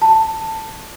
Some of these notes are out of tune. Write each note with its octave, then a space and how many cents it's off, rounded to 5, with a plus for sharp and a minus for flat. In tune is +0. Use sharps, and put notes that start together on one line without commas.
A5 +10